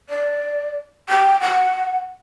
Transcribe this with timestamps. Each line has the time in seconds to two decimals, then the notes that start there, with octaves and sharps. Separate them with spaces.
0.10 D5
1.09 G5
1.41 F#5